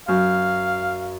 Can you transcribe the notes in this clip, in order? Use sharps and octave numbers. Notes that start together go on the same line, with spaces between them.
F#2 F5